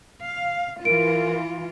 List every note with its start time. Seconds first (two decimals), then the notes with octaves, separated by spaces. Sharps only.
0.25 F5
0.85 E3 F4 A#4 D7